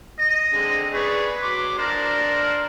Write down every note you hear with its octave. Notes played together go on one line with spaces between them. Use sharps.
D#5
D3 G#3 C4
G#4 B4 D5 C#6
F#3 C6 D6
D4 A#4 C5 D5